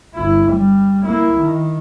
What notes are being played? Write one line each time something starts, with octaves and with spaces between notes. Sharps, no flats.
G1 E4
G3
A#3 E4
D#3